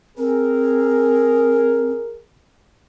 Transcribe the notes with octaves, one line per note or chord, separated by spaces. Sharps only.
C4 G#4 A#4